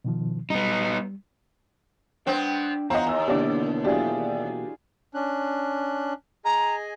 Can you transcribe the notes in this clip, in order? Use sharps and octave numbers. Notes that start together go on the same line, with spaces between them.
B2 D#3 F3
G3 B3 D#4
B3 C4 D4 G5
E2 C4 F4 D#5 F#5 A#5
D#2 G#5 E6
B2 D3 E3 A#3 D4 G4 D5
F#3 D4 E4 F4 G4 G#4
C#4 D4 F#6
G#4 D#5 G#5 A#5